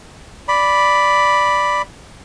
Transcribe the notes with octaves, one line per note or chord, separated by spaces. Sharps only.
D5 B5